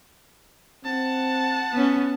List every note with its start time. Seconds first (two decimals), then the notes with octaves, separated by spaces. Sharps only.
0.85 C4 F#5 A5
1.73 B3 C#4